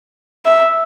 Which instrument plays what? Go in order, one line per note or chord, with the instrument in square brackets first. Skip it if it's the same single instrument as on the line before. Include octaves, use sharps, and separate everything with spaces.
[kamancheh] E5